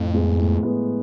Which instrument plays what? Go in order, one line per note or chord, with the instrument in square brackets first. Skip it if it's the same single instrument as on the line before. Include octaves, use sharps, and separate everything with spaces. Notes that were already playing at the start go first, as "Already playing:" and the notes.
Already playing: [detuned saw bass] F2 [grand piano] A2
[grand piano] G#3 B3
A2
G#3 B3